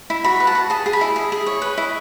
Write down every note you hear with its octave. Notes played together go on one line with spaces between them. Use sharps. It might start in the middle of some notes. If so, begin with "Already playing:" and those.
E4
F#4 B5
B4
A5
F#4
G#4 A5
G#4
B5
E4
G#4
G#4
C#5
B4
E4